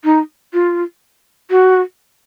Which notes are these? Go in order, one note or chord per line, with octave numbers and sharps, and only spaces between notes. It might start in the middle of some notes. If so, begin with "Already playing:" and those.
D#4
F4
F#4